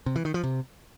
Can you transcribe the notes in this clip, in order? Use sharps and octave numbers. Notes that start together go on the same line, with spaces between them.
C3
E3
D#3
F3
C3